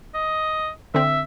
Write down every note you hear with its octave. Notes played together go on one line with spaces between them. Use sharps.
D#5
D3 C4 E5